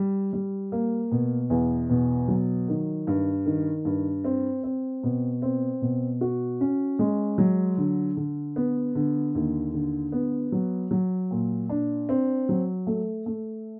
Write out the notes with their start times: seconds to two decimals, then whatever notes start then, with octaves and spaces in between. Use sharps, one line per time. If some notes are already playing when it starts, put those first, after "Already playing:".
Already playing: G3
0.33 G3
0.72 A#3
1.12 B2
1.50 E2
1.90 B2
2.28 F#3
2.68 D#3
3.07 G2
3.46 D#3
3.85 G2
4.24 C4
4.63 C4
5.03 B2
5.42 C4
5.82 B2
6.21 F#4
6.61 C#4
6.99 G#3
7.38 F#3
7.77 D3
8.17 D3
8.56 B3
8.95 D3
9.35 D#2
9.74 D3
10.12 B3
10.52 F#3
10.91 F#3
11.31 A#2
11.69 D4
12.09 C4
12.49 F#3
12.87 A3
13.26 A3